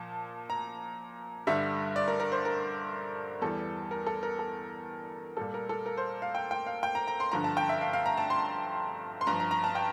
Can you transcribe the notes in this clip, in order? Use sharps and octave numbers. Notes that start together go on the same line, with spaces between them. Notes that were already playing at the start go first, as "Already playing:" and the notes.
Already playing: A#2 F3 A5
A#5
G2 D3 G3 E5
D5
A#4
A#4
C5
A#4
E2 E3 G3 A4
A#4
A4
A#4
A4
A#2 G3 A4
A#4
A4
A#4
C5
F5
G5
G5
F5
G5
A#5
A#5
C6
G2 D3 F3 A#5
A5
G5
E5
F5
F5
A#5
A5
C6
C6
G2 F3 A#5
A#5
A#5
A5
G5